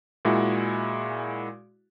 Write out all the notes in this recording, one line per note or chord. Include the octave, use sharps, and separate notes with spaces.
A#2 G#3 E4 F#4